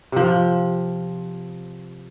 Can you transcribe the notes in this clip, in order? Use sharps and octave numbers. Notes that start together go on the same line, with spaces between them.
C3 F3